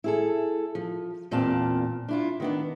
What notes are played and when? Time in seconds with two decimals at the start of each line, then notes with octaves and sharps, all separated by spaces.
0.04 E4 G#4 A4
0.75 F3
1.31 E2 A#2 C4 D5 F5 A5
2.09 D4 E4 F4
2.40 D#3 B3 D4